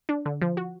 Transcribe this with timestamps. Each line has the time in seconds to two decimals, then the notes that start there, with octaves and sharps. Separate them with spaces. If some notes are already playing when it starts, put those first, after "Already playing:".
0.09 D4
0.26 D3
0.42 F3
0.57 F#4